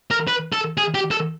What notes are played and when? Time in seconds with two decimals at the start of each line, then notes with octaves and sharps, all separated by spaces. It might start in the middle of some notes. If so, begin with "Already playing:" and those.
0.11 A#4
0.28 B4
0.53 A4
0.78 G#4
0.94 G4
1.11 A4